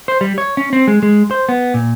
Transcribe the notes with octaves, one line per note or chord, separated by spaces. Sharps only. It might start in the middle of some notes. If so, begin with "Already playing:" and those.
C5
G3
C#5
C#4
C4
G#3
G#3
C5
B3
A#2